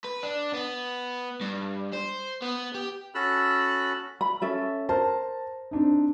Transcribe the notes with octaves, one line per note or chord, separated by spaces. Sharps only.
B4
D4
B3
G2
C5
B3
G4
C#4 F#4 A4 B5 E6 F#6
B5
C#4 A4 E5
A#4 C5 A5
C4 D4 D#4